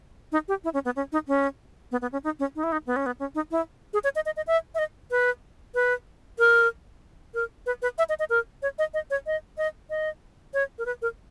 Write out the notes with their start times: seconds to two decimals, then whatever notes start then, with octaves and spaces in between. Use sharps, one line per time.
0.32 D#4
0.48 G4
0.64 E4
0.74 C#4
0.85 B3
0.96 C#4
1.12 D#4
1.28 C#4
1.92 B3
2.02 B3
2.12 C#4
2.24 D#4
2.39 C#4
2.56 D#4
2.63 E4
2.72 D#4
2.87 B3
2.96 C#4
3.06 B3
3.19 C#4
3.35 D#4
3.51 E4
3.93 G#4
4.04 C#5
4.15 D#5
4.26 D#5
4.37 D#5
4.47 E5
4.75 E5
4.79 D#5
5.11 B4
5.75 B4
6.38 A#4
7.34 A#4
7.66 B4
7.82 B4
7.98 E5
8.09 D#5
8.19 D#5
8.30 A#4
8.62 C#5
8.79 D#5
8.94 D#5
9.10 C#5
9.27 D#5
9.58 D#5
9.90 D#5
10.54 C#5
10.78 A#4
10.86 B4
11.02 A#4